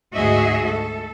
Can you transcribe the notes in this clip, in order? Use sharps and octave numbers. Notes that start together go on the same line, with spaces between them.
D2 G#2 F#4 G#4 D#5 E5
A4